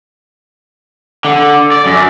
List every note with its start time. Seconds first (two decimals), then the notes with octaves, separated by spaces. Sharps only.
1.25 D3
1.72 D5
1.86 F#2